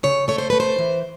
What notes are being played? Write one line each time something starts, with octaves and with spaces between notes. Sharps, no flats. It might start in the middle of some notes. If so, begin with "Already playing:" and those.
C#3 C#5
A3 C#5
C5
A3 B4
C5
E3